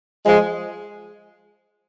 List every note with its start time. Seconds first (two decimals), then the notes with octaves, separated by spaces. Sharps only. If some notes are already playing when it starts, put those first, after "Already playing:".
0.25 F3 G#3